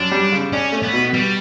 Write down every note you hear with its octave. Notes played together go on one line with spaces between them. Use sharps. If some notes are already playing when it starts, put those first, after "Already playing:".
Already playing: F#2 D4
G3
C#3
C#4 D4
A3
B3
B2
G3 B3